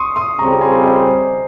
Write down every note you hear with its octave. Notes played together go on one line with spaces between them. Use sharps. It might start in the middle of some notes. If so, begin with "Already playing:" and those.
Already playing: C6 C#6 D#6
C6 D#6
F2 C#3 G3 C4 A#5 C#6
G#5 C6
C5 D#5
C5